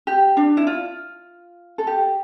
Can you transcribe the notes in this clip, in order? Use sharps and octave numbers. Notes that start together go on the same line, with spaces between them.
G4
D4
E4
F4
A4
G4